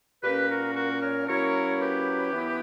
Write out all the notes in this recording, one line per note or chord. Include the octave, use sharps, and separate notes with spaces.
A#2 A#3 C#4 G4 B4
F#4 A#4
F#4 A#4
A#4 C#5
F#3 A#3 C#4 E4 A#4 C#5
G4 B4
E3 B3 E4